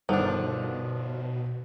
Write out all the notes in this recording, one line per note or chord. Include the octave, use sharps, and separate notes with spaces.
G1 B2 D#3 F3 D4 A4 F#5